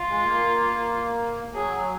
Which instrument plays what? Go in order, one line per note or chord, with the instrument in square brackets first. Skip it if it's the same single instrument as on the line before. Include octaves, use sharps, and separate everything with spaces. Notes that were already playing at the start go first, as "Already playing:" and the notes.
Already playing: [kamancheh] F4
[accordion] G#3
A#3
[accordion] F#3 [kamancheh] G#4